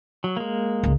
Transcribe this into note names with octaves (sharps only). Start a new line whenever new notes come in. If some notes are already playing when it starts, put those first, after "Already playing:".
F#3
G#3 A#3
C#2